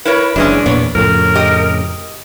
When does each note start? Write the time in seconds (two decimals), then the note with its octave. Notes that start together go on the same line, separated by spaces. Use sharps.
0.05 E4 A#4 B4 C#5
0.36 F#1 E3 G#3 C#4 D4
0.66 E2 A#2 B3 C#5
0.95 F2 A2 C#3 A#4
1.35 G4 D#5